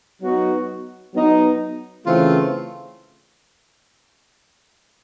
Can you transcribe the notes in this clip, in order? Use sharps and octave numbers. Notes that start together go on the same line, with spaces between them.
F#3 B3 D#4 F#4
F#3 B3 D#4
C#3 E3 A3 C4 F4